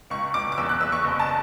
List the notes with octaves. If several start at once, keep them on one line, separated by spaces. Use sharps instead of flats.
C#2 C#6
C#2 D6
D6
E2 E6
F#6
E2 E6
C#6
F#1
A5